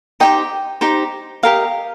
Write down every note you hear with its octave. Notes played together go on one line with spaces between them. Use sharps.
D#4 G4 C5 D#5 G5
D#4 G4 C5
G4 A#4 D#5 F5